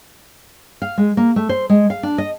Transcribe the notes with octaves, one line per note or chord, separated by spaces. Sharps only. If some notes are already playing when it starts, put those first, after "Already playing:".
F5
G#3
A#3
A3
C5
G#3
F5
D4
D#5